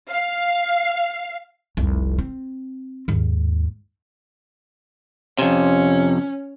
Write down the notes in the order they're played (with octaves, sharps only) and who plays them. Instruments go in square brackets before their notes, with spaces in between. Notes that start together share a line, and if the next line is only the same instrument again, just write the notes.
[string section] F5
[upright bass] F1 C2
C4
D#2 G#2
[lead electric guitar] F2 C3 [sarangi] C#4